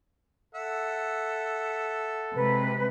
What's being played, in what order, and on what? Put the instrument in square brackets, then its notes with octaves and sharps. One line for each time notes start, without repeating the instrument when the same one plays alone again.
[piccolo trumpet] A4 [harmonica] E5 F#5
[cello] C3 G#3 [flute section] B4